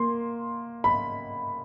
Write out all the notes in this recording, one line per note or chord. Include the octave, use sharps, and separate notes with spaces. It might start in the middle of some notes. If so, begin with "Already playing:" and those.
Already playing: A#3 C6
B5